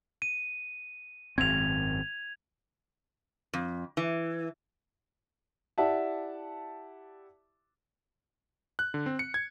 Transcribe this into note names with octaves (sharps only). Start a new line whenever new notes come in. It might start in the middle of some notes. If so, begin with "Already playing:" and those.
D#7
G#1 F#2 C4 G#6 F7
F2
E3
E4 G4 D5 E5 F#5 A5
F#6
D3
C4
C#7
G#6